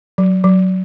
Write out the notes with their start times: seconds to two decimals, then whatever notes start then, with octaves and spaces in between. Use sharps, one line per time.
0.18 F#3
0.44 F#3